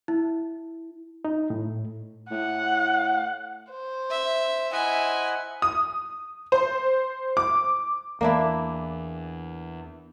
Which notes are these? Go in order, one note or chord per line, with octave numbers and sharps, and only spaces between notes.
E4
D#4
A2
A2 F#5
C5
E5
E4 C5 D#5 E5 F#5 G#5
D#6
C5
D6
E2 A#3 D4 E4